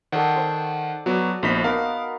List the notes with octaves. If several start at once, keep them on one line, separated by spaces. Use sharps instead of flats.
D#3 A4 D5 F#5
C5
F#3 B3 F#4 D5
A#1 B3 D#4 C5 B6
B3 D#4 A#4 F5